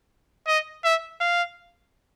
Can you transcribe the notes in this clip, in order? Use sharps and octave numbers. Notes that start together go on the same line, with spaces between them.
D#5
E5
F5